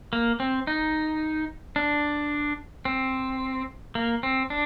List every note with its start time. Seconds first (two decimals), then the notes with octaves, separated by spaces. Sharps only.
0.13 A#3
0.40 C4
0.67 D#4
1.76 D4
2.85 C4
3.95 A#3
4.23 C4
4.50 D4